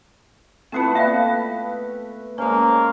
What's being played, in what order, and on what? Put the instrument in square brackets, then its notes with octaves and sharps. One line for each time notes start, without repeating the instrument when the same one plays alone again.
[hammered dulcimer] A3 B3 B4 [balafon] C4 E4 F4
[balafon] A#3 D5 [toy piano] E5 F5 G5
[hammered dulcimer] G#3 C#4 [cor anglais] A#3 [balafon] C5